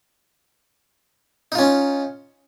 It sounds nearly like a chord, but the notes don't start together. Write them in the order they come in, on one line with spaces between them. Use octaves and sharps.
D#4 F4 C#4